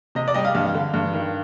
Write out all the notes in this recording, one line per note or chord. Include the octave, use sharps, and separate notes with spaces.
C3 D#5
D5
G3 D#5
F5
G2 F5
D3
G2
D#3